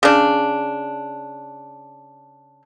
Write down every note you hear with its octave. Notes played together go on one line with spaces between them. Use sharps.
C#3 D4